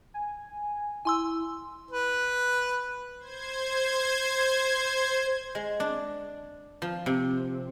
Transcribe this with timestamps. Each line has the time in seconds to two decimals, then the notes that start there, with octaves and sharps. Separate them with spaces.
0.14 G#5
1.05 E4 G#5 C6 E6
1.91 B4
3.19 C5 G#6
5.55 G#3
5.80 D4
6.82 F3
7.06 C3